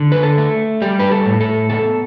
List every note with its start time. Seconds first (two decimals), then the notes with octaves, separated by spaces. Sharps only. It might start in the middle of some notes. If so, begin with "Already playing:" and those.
Already playing: D3
0.12 B4
0.23 A4
0.38 A3
0.81 G3 G4
0.99 B4
1.11 A4
1.26 A2
1.41 A4
1.70 B3 A4